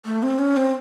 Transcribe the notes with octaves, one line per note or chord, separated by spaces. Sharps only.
A3
C4
C#4
C4